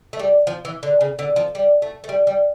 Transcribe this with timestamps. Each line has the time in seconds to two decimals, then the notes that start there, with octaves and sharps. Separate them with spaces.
0.13 A3
0.19 G3
0.47 F3
0.65 E3
0.83 D3
1.01 C#3
1.19 D3
1.36 F3
1.55 G3
1.82 A3
2.04 A3
2.09 G3
2.27 G3